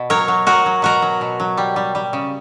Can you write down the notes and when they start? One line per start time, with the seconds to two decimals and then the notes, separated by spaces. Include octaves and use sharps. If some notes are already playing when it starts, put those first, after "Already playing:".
Already playing: B2
0.10 F#3 A#4 C#5
0.28 F#3
0.47 F#3 F#4 A#4
0.66 F#3
0.82 B2 F#4 A#4
1.02 F#3
1.21 B2
1.40 F#3
1.57 G3
1.76 G3
1.95 G3
2.13 C#3